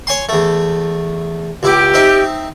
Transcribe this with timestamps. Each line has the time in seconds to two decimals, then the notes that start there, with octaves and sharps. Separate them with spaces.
0.07 C#5 G#5 C6
0.29 E2 A3
1.63 C#2 E4 G4 D6
1.94 C4 D#4 E5